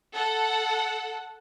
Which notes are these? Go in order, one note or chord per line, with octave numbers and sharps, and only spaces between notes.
A4 F#5